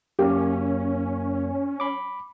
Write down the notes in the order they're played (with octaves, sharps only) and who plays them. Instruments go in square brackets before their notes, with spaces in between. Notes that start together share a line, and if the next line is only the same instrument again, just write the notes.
[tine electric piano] F#2 A#3 [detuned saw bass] C#4 [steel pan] G4
[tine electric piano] B5 D6